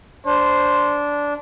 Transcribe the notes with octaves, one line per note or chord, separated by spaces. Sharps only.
D4 C5